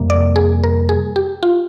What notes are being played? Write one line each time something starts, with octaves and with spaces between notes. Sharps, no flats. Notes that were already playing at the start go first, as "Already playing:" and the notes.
Already playing: F2 C3 G3 A#3
D5
G#4
A#4
G#4
G4
F4